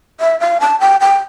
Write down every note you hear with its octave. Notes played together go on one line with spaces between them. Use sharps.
E5
F5
A5
G5
G5